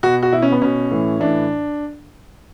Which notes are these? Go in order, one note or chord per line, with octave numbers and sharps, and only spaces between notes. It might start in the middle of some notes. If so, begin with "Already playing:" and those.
B2 F#4
F#4
B2 E4
C#4
B3
B2 C#4
A2 E3
A2 E3 D4